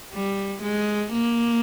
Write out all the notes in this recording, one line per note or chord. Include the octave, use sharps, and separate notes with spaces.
G3
G#3
A#3